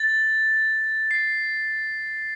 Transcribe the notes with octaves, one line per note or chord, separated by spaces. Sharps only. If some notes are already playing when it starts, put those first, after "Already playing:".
Already playing: A6
C7